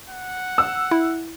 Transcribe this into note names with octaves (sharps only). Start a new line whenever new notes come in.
F#5
E6
E4